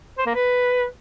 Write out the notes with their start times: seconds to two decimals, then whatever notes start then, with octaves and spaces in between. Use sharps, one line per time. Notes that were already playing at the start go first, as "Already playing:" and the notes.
0.18 C5
0.26 A#3
0.34 B4